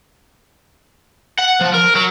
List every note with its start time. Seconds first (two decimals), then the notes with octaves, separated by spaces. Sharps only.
1.39 F#5
1.61 F3
1.74 A#4
1.96 F#3